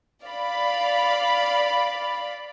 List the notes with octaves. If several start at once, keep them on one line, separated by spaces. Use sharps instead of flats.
D5 F5 B5